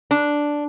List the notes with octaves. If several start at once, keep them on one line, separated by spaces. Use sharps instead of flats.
D4